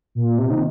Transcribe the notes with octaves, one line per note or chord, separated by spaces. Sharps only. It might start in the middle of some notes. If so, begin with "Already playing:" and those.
A#2
C3
D#3